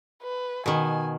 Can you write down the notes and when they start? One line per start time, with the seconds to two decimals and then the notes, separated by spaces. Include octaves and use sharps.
0.23 B4
0.66 B2 D#3 G#5